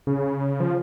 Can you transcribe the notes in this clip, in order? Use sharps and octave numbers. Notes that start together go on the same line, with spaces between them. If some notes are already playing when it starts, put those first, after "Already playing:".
C#3
F3